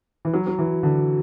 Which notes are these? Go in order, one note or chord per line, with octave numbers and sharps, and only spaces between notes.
E3
F#3
F#3
E3
D3